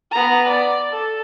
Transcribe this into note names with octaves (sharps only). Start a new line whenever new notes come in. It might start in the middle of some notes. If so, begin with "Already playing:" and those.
B3 A#5
D5
A4